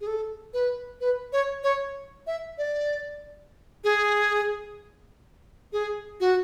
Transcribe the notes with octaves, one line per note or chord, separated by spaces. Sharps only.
G#4
A4
B4
B4
C#5
C#5
E5
D5
G#4
G#4
F#4